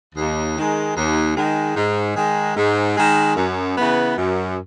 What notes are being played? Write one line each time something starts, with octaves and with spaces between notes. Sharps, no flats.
D#2
D#3 G#3
D#2
D#3 G#3
G#2
D#3 G#3
G#2
D#3 G#3
F#2
C#3 E3 B3
F#2